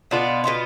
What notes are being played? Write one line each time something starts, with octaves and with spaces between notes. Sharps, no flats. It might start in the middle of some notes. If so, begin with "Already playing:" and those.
B2 B3 D4 F4
B2 B3 D4 F4